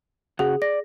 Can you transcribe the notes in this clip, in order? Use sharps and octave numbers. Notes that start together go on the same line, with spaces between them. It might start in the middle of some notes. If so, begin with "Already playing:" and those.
C#3 F#4 G#4 F#5
D5 A#6